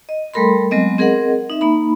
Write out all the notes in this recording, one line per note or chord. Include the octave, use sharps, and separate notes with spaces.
D#5
G3 A3 A4 A#4 B5 C6
F#3 G#3 B3 C4 D#5
C4 G#4 A#4 D#5 F#5
D#4 E5
A#3 D#4 B5